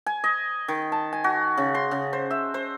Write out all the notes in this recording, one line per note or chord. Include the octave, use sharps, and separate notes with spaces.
G#5
D#5
D#3
A5
G#5
F#4
C#3
C6
C#3
C5
E5
C5